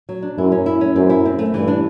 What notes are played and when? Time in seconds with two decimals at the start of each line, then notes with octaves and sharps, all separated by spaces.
0.09 F#3
0.22 D4
0.38 F#2 E4
0.52 C#4
0.66 E4
0.81 C#4
0.96 F#2 C4
1.10 E4
1.25 C4
1.39 A3
1.54 G2 E3
1.68 D4